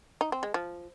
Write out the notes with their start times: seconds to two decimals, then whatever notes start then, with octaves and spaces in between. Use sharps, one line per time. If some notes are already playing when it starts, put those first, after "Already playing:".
0.21 D#4
0.32 C4
0.43 G#3
0.54 F3